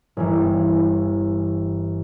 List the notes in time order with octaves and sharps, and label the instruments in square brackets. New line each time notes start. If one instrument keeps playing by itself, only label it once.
[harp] G1 E3